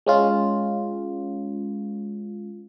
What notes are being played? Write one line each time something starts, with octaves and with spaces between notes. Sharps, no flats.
G#3 C#4 F4